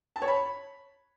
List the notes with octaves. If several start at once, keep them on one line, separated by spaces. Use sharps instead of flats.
A5
C#5
B5